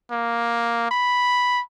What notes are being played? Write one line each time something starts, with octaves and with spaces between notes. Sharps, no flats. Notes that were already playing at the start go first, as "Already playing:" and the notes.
A#3
B5